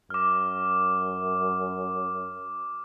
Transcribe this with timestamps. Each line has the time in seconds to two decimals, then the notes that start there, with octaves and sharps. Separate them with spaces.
0.10 F#2 D6 F6